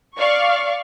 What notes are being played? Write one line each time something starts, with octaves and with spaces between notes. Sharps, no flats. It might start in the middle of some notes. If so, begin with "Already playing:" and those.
D5 F5 C#6